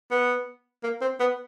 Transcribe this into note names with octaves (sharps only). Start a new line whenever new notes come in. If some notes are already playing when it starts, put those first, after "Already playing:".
B3
A#3
C4
B3